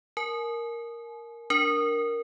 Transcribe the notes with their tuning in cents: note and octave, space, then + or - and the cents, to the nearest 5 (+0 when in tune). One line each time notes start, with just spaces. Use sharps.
A#4 +0 G#5 +40
D4 -10 A#4 +0